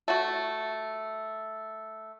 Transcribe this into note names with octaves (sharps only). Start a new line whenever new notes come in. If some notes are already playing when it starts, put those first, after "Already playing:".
A3 F#4